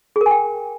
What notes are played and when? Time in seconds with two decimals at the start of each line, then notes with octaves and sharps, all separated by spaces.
0.16 G#4
0.21 A#4
0.26 G#5
0.31 G5